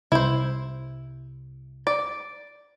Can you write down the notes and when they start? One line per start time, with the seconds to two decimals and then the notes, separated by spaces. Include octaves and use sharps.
0.12 C2 E4 C5
1.87 D5